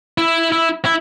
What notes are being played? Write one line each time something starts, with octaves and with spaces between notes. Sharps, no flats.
E4
E4
E4